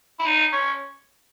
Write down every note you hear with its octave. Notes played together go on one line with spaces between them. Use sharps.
E4
D#4
C#4